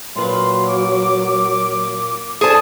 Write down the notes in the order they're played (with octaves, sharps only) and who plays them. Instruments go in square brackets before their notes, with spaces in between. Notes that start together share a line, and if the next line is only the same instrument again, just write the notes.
[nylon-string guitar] A#2 A#3 B4 [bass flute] F#3 [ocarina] C6
[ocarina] D6
[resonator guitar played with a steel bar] G#4 A5 [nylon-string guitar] A4 C5 [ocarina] D5